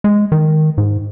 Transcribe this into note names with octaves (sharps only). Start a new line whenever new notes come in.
G#3
D#3
G#2